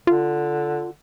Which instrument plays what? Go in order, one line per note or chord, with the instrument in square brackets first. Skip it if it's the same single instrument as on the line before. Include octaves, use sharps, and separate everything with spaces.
[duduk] D3 [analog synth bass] F4